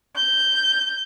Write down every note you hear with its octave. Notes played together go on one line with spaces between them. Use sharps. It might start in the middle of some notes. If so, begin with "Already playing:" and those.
G6